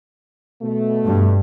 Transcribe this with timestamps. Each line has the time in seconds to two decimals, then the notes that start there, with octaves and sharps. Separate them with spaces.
0.62 B2 A3
1.05 G2